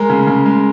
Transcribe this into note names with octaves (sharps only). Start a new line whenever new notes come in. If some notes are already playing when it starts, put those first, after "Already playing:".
Already playing: G#3 A#4
C#3
C#3
G#3